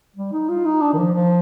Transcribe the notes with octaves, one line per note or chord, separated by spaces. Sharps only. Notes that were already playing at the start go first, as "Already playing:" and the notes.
G3
D#4
F4
D#4
D4
D#3
F3
F3